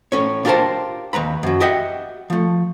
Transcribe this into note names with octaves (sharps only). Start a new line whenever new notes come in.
A2 C#4 C#5
D4 F4 G4 A#4 C5 A5
D#2 B4 A#5 B5
F#2 F#3
G4 D#5 E5 F#5 G5
F3 A3